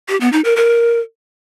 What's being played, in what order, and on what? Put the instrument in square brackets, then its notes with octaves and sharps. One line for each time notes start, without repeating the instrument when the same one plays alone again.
[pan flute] G4
B3
D#4
A#4
A#4